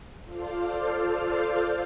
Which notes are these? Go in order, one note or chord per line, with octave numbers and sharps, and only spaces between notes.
F4 A4 C5 D5 F5